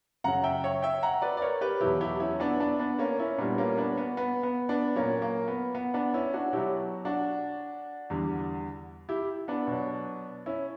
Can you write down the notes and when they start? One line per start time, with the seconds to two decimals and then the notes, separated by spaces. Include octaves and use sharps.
0.24 F#2 C#3 F#3 F#5 A#5
0.44 E5 G5
0.64 C#5 E5
0.82 E5 G5
1.03 F#5 A#5
1.22 B4 D5
1.37 D5
1.42 A#4 C#5
1.61 G4 B4
1.81 E2 B2 F#3 E4 G4
2.01 E4 G4
2.20 C#4 E4
2.40 B3 D4
2.60 B3 D4
2.79 B3 D4
2.99 A#3 C#4
3.19 C#4 E4
3.38 A#2 G3 B3 D4
3.58 A#3 C#4
3.77 B3 D4
3.98 B3
4.17 B3
4.43 B3
4.69 B3 D4
4.96 A#2 F#3 A#3 C#4
5.22 A#3
5.48 B3
5.75 B3
5.94 B3 D4
6.14 C#4 E4
6.34 D4 F#4
6.53 B2 F#3 E4 G4
7.05 D4 F#4
8.10 E2 D3 G3
9.09 E4 G4
9.48 B3 D4
9.67 B2 F#3
10.46 C#4 E4